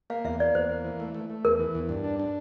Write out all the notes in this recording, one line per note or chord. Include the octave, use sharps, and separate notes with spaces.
A#3 F5
E2 E5
A#3 D5
E2 C5
A#3
E3
A3
A3
A3
E2 A#4
E3
E2
G2
D4
D4